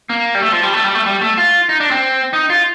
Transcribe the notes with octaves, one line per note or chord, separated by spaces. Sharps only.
A#3
G3
A3
F3
G3
A3
G3
A3
G3
A3
F4
D#4
D4
C4
D#4
F4